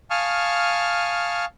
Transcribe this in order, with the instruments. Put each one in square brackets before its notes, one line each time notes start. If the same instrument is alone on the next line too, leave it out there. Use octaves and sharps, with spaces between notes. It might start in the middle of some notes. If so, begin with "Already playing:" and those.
[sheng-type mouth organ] F5 G#5 A5 C#6 D#6 F6